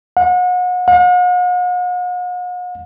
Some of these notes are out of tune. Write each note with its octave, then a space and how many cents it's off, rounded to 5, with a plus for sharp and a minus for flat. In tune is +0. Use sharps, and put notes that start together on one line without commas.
F#5 -35
F#5 -45